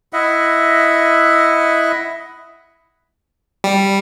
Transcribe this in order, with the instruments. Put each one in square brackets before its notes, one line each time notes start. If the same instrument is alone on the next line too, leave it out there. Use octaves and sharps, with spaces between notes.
[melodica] E4 D#5 E5 F#5
[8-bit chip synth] G3